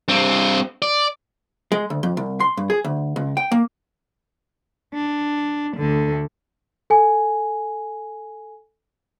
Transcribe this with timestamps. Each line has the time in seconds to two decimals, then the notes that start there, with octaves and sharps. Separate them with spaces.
0.08 G2 C4
0.82 D5
1.72 G#3
1.90 D2
2.03 F2
2.17 C2
2.40 C6
2.57 G2
2.70 G#4
2.84 D2
3.16 C#2
3.37 G5
3.52 A#3
4.94 D4
5.76 D2 D3
6.90 A4 G#5